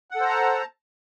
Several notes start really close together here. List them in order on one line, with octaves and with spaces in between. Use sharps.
F#5 A4 C5 A#5 A5